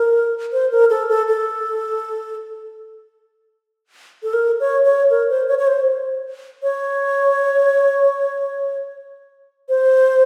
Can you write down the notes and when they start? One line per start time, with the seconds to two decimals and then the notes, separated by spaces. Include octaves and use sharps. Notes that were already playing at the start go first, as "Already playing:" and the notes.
Already playing: A#4
0.53 C5
0.72 A#4
0.90 A4
1.09 A4
1.28 A4
4.23 A4
4.33 A#4
4.60 C#5
4.85 C#5
5.10 A#4
5.30 C5
5.48 C#5
5.59 C#5
5.67 C5
6.63 C#5
9.69 C5